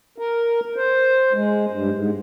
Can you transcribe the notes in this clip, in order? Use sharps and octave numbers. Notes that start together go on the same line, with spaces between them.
A#4
C5
G#3
G2
G#2